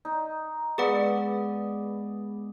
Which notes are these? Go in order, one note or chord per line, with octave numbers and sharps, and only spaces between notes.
D#4
G#3 B3 G#4 B4 D5 D#5 F#5 B5